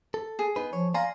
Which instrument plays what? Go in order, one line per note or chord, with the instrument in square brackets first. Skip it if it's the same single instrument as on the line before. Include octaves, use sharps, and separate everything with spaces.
[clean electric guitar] A4
[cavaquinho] G#4
[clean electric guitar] B3 D#4 B4
[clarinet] F3 [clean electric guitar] C#5
[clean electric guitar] D5 G#5 [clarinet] F5 [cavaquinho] A#5 C6